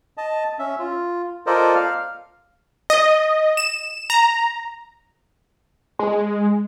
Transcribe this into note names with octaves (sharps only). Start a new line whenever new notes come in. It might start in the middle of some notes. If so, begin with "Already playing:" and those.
D#5 A5
C#4 E5
F4
F4 A4 A#4 C5 D5 D#5
F5 F6
D#5
E7
A#5
G#3